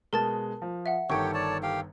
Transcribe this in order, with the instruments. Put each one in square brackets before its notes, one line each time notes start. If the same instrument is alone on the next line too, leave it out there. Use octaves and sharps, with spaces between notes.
[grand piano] B2 G#3 [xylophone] A#4 A5 A6
[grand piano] F3
[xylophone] E5 F#5
[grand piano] G1 D#3 A4 [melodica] G4 C#5 G5 [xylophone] C#6 D7
[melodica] C#5 D5 A5
G4 F5 G5